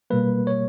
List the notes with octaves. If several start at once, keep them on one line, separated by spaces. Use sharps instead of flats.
B2 G3 A#3 B4
C#5